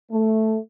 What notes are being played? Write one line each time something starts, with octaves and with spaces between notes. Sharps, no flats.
A3